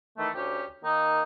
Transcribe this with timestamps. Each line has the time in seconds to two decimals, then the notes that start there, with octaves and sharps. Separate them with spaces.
0.17 D#3 E3 A3
0.34 D2 C#4 G4
0.83 D#3 A#3 D#4